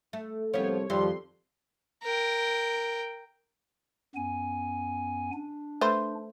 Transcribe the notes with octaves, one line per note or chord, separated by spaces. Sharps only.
A3
C2 F3 B3 C4 A4 C#5
F2 D#3 F3 G3 C6
A#4 G5
F#2 B3 G#5
D4
A3 B4 C5